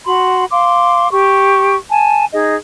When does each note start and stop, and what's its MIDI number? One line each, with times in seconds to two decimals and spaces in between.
0.06 0.44 66
0.06 0.44 83
0.06 0.44 84
0.51 1.09 77
0.51 1.09 84
0.51 1.09 86
1.11 1.76 67
1.11 1.76 85
1.90 2.25 80
1.90 2.25 81
2.33 2.55 63
2.33 2.55 68
2.33 2.55 75